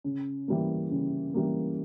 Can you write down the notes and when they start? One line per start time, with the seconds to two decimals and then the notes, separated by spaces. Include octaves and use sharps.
0.04 C#3
0.48 E3 G3 A#3
0.91 C#3
1.34 E3 G3 A#3